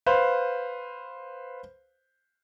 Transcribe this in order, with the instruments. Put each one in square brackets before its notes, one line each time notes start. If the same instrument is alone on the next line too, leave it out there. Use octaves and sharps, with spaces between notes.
[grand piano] B4 C5 F5